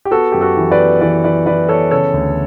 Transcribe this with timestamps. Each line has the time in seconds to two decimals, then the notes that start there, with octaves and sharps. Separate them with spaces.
0.05 G4
0.11 B3 F#4 A4
0.32 F#2 G4
0.41 F#4 A4
0.57 E3
0.71 B4 D5
0.78 B3
1.01 E3 B4 D5
1.24 E3 B4 D5
1.46 E3 B4 D5
1.69 B3 A4 C#5
1.91 C#3 A4 C#5
2.14 D2